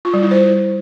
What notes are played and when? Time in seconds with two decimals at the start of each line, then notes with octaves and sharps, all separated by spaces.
0.05 F4
0.14 G3
0.22 E4
0.31 C5